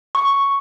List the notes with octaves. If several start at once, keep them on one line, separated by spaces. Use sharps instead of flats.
C#6